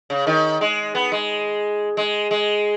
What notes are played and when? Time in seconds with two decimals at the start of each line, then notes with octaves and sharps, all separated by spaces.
0.10 C#3
0.27 D#3
0.61 G#3
0.95 B3
1.12 G#3
1.97 G#3
2.31 G#3